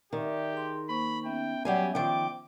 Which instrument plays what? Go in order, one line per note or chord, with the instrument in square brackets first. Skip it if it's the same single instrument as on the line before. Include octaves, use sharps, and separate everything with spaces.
[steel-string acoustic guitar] D#3 [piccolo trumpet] G4 [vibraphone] D5 E5
[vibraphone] G#4 C6
[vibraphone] A#3 C5 C#6 [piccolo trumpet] B5
[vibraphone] B3 C#4 E5 [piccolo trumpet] G5
[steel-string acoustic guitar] F#3 G3 G#5 [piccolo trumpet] G4
[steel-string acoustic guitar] D#3 F3 G5 [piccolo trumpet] D6